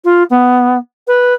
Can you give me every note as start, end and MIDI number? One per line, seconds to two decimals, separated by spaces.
0.05 0.23 65
0.30 0.78 59
1.08 1.34 71